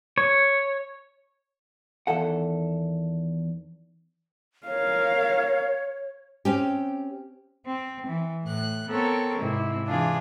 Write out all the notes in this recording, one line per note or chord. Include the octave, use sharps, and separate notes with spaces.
C#5
E2 D#3 A4 F#5
A#4 C#5 F5
C4 C#4 G4
C4
E3
A2 F#6
B3 C4 A4 A#4 C#5
G#2 C3 E4
C3 E3 D4 F4 G#4